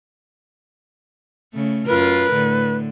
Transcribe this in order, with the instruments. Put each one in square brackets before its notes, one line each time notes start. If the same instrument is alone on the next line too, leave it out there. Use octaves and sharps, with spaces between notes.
[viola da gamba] C#3 A3
[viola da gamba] F#2 F4 A#4 [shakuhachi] B4
[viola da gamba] A2 D3